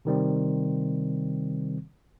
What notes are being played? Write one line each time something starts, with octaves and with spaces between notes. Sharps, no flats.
C3 D#3 G3 C4